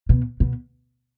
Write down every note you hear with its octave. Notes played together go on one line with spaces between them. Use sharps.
B2
B2